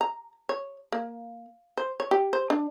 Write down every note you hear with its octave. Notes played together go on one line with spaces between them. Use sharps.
A#5
C#5
A#3
C5
C#5
G4
C5
D4